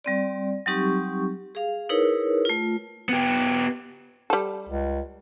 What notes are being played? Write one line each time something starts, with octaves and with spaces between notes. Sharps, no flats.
G3 C4 D5
F#3 G3 C4 D#4 G4 C#6
G#4 F5
D#4 E4 G#4 A#4 B4 C#5
A3 F4
B3 G4
G3 A4
C#2